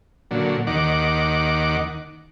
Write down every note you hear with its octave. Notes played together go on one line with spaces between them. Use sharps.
A#2 D3 F#3
D#2 D#3 F#5 D6